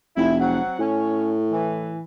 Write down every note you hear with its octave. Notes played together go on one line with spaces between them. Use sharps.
F1 E4
F#3 C4 F#5
A2 C#4
E3